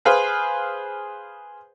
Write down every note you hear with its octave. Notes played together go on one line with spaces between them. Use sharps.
G#4 B4 C5 F5